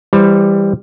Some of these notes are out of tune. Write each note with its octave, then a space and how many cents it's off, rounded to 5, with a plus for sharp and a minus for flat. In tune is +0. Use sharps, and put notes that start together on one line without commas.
E3 +10 G3 +15 C5 +0